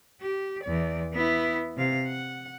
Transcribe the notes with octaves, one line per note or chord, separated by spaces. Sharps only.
G4
E2 D5
B3 E4
C3 F5
F#5